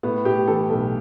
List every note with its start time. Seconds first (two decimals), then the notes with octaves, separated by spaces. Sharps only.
0.03 A2 B3
0.25 A2 G4
0.47 E3 A4
0.70 B1 A4